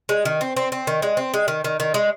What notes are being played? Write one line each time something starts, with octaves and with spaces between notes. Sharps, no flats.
G#3
D#3
C4
C4
C4
D#3
G#3
C4
G#3
D#3
D#3
D#3
G#3